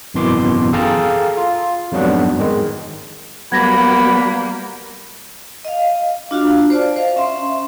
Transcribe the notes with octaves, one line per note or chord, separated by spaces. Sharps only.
G#1 F#2 B2 E3 C6 D6
G#4 A4 F5 G5 A5 A#5
F4
F2 G#2 F#3 G3 B3 D4
G#2 D#3 G#3
F#3 G3 A#3 B3 F#5 B5 G#6 A#6
D#5 F5
D4 F4 F#4 F5
C5 D5 A5
C5 D#5 F5
C#4 E5 C6